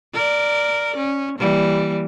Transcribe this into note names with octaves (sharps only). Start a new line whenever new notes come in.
A#4 D5
C#4
E3 G3 A#3